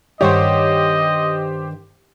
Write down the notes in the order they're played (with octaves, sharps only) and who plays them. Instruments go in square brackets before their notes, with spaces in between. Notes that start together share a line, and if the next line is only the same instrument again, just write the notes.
[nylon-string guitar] G2 D#3 F#5 [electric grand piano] G4 C5 [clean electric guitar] C#5 [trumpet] D#5